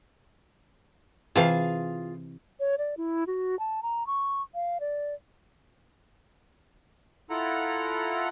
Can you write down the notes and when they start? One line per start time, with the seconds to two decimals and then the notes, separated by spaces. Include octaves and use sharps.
1.35 C3 E3 F4 G#4 F5 A5
2.60 C#5
2.78 D5
2.97 E4
3.27 F#4
3.59 A5
3.83 A#5
4.07 C#6
4.55 F5
4.80 D5
7.30 E4 F4 A4 F#5 A#5